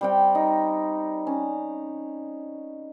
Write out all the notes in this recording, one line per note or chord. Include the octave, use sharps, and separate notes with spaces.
G3 C4 G5
D#4
C#4